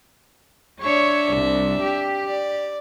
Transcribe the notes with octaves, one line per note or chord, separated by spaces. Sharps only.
D4 C#5 E5
C2
G4
D5